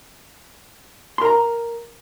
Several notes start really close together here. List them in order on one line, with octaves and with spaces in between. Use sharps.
C6 A#4 A#5